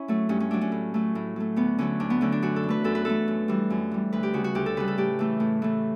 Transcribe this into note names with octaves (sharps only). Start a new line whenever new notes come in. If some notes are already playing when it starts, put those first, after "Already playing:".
Already playing: C#4 E4
F#3 A3
G2 C#4
C#4
F#3 A3 D4
C#4
A2
F#3 A3
A2
F#3 A3
D2 B3
D3 F#3 A3 C#4
D2 D4
B3
D3 F#3 A3 C#4
D4
F#2 F#4
A4
E3
A3 B4
F#2 A4
B4
E3 A3 A4
F#2
E3 G3
F#2
E3 G3
D2 B4
G4
C#3 G3 F#4
F#4
D2 G4
A4
C#3 G3 B4
A4
A2 G4
E3 A3
A2
E3 A3